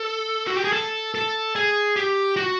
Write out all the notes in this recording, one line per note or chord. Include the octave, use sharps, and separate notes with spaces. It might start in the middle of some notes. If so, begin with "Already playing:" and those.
Already playing: A4
F#4
G4
G#4
A4
A4
G#4
G4
F#4